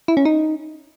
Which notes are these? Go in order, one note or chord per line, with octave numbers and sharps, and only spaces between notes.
E4
C#4
D#4